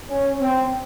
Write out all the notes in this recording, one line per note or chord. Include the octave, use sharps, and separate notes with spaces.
C#4
C4